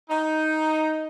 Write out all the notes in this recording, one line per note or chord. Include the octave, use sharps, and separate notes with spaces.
D#4